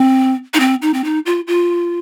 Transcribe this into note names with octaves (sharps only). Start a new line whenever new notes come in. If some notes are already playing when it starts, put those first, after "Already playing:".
Already playing: C4
D#4
C4
D#4
C4
D#4
F4
F4